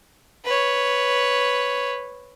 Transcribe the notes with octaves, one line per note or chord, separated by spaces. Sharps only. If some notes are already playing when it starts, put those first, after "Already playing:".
B4 C#5